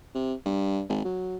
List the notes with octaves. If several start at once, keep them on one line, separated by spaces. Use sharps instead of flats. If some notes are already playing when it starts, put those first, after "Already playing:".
C3
G2
G#1
F#3